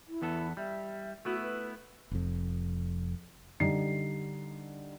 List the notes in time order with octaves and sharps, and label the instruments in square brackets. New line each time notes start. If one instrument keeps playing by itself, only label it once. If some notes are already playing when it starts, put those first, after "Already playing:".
[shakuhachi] E4
[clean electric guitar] E2 B3 A4
[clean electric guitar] G3 [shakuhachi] E5
[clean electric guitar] A3 B3 E4 [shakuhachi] F#4
[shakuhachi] B4
[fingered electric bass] F1 F2
[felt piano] D3 G3 D#4 C7